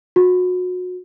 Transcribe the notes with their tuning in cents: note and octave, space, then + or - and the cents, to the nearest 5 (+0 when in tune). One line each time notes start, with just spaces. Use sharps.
F#4 -30